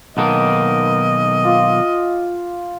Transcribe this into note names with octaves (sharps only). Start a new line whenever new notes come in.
B1 D#3 A#3 G#4 D#5 F#5 A5
F4 D6